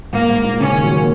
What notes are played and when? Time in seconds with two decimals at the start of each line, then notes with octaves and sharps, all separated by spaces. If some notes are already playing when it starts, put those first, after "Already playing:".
0.13 G#2 A#3
0.29 G#2
0.44 A#2
0.60 C#3 C#4
0.72 D#3
0.84 F#3
0.95 A#3